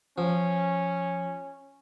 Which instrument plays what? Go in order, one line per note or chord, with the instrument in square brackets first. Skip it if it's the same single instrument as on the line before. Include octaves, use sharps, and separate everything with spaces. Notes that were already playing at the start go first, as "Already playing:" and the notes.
[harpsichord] F3 [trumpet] C#4